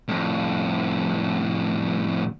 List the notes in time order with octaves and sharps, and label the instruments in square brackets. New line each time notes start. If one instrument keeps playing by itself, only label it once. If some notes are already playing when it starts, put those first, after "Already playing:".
[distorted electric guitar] F2 A2